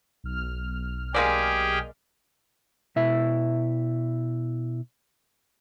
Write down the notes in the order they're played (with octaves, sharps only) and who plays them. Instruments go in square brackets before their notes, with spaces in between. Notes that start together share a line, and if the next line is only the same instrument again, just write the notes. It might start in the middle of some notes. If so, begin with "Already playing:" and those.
[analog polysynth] B1 F6
[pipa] G#3 A#3 D5 [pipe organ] G4 G#4 G5
[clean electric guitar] B2 E4 E5